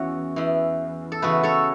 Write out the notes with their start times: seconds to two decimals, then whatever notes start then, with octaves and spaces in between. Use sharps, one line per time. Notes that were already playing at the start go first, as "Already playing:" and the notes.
Already playing: E2 E3 C#4 F#4
0.36 E2 E3
1.12 A4
1.22 E2 C#3 E3 F#4 B4
1.43 A4 C#5